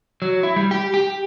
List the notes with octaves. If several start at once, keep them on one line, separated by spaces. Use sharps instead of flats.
F#3
E4
G3
G4
G4